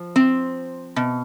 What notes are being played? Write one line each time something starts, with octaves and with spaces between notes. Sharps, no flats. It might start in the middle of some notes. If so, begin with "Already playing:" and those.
Already playing: F3
C4
B2